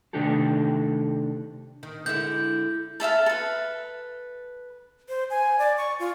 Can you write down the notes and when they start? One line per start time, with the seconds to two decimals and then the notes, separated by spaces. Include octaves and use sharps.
0.13 C3 D#3 A3 D4 G4 A4
1.83 D#3
2.06 D3 G#3 E4 G6
3.00 A4 E5 F5 A5
3.26 A4 B4
5.09 C5
5.30 G#5
5.59 D5
5.77 C#6
5.99 F4